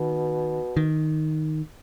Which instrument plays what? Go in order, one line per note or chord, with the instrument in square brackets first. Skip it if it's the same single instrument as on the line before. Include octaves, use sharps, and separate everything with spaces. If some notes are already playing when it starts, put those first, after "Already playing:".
Already playing: [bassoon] B2 [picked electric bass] D#3
[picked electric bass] D#3